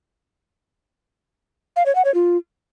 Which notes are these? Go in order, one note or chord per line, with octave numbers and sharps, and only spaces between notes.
F5
C#5
F#5
C#5
F4